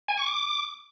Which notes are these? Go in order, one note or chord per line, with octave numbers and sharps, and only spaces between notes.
G#5
C#6
D6